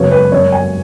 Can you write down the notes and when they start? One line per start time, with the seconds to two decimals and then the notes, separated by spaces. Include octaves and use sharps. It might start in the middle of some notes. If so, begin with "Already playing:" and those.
Already playing: F#2 C#3 F#3 B3 C#5
0.11 B4
0.32 F#2 F#3 B3 C#5
0.52 G#5